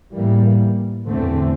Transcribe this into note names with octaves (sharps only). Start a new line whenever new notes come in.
A2 E3 G3 A#3
E2 D3 A3 C4